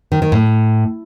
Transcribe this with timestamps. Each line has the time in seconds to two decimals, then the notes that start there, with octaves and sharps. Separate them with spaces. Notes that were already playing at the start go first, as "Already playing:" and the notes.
0.12 D#3
0.22 D#3
0.32 A2